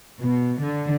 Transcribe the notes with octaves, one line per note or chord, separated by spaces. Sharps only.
B2
D3